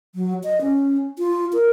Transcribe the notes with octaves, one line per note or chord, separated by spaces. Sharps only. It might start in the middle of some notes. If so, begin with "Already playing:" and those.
F#3
D#5
C#4
F4
A#4